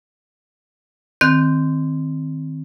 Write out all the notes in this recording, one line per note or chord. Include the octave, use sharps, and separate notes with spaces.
D#3 C4 F#6 G6